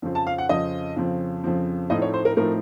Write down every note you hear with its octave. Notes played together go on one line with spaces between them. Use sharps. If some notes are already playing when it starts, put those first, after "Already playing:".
F2 C#3 F3 C4
A5
F5
F#5
F2 C#3 F3 C4 D#5
F2 C#3 F3 C4
F2 C#3 F3 C4
A2 F3 A3 C4 D#4 D#5
C#5
C5
A#4
A2 F3 A3 C4 D#4 A#4